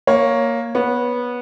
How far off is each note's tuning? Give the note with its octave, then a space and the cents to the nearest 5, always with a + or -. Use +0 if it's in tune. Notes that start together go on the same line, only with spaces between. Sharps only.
A#3 +0 C#5 +0
B3 -15 C#5 +0